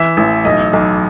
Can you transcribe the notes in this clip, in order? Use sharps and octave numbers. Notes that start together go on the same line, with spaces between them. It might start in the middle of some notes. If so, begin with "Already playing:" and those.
Already playing: E3 E5
A1
B1 D#5
B1